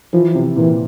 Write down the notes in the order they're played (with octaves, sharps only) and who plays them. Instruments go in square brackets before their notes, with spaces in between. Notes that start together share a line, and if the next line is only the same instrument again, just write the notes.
[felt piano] E3 [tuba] F3
[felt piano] C3
[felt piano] A#2 [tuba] E3